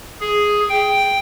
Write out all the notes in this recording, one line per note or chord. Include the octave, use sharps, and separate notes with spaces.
G#4
G5